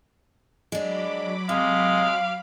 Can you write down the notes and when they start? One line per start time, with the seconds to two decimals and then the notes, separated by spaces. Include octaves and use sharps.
0.72 F#3 G#3 D4 B5 D6
1.49 C3 G#3 F5